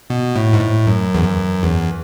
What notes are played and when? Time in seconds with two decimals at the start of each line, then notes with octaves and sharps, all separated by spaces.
0.10 B2
0.35 A2
0.53 G#2
0.60 A2
0.87 F#2
1.14 E2
1.24 F#2
1.63 E2